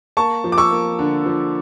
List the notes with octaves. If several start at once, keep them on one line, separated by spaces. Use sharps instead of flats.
A#3 A5 C#6
F3
D6
C#6 E6
A#3
D3
F3